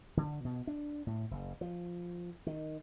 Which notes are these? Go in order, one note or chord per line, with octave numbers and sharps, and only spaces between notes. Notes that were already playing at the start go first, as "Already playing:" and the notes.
D3
B2
D4
A2
F#1
F3
D#3